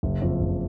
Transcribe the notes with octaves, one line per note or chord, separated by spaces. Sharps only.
F#1
F2
F#1